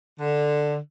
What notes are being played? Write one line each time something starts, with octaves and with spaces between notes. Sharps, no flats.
D3